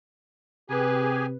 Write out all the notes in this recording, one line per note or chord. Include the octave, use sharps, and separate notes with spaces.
C3 G4 G#4 B4 G#5